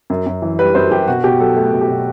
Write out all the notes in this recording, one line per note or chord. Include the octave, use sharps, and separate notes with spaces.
F#2
F#2
E3
G3 B4
F#2 C5
F#2 G4
B2 F#4
B2 G4
F#3 A4
A3
B2
G4
B2